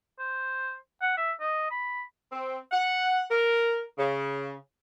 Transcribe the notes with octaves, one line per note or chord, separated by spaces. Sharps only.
C5
F#5
E5
D#5
B5
C4
F#5
A#4
C#3